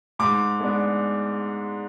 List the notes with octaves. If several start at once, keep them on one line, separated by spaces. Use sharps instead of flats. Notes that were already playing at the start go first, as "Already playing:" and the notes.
G#2 D6
G#3 B3 D4